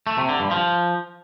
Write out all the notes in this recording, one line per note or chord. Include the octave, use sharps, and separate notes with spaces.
A3
C3
D3
G2
F3